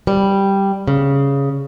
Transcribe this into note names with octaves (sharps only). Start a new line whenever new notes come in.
G3
C#3